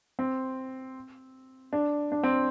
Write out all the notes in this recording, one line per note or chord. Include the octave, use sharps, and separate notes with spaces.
C4
D4
D4
C4